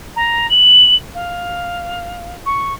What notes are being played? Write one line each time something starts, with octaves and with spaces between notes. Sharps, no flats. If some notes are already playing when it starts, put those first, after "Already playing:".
A#5
F#7
F5
C#6